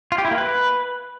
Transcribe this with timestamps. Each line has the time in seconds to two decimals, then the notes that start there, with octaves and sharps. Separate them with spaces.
0.12 F4
0.18 G4
0.25 E4
0.31 A#3
0.38 B4